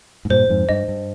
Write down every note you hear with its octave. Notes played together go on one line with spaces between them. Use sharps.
G#2
G2 A#2 C5
F2 G#2
G2 D#5
G2